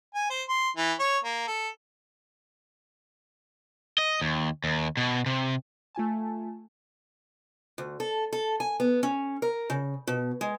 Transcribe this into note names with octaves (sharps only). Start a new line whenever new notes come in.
G#5
C5
C6
E3
C#5
A#3
A4
D#5
D#2
D#2
B2
C3
A3 F4 G#5 A5
D2
A4
A4
G#5
B3
C#4
A#4
C#3
B2
G#3